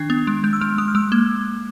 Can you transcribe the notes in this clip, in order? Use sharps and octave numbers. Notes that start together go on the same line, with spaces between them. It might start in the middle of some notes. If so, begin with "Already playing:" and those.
Already playing: D#3 D4 G#6
B3
G#3
G#3 G6
E6
G#3 F6
G#3 D#6
F6
G#3 E6
A#3